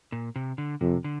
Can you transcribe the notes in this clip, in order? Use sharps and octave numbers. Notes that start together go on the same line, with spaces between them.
A#2
C3
D3
F2 C3
D3